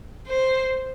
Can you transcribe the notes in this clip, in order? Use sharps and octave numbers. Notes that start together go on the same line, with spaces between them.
C5